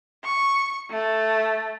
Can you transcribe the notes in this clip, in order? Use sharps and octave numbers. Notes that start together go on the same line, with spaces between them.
C#6
A3